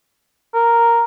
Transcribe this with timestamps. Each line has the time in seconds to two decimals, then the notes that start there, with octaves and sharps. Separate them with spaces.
0.55 A#4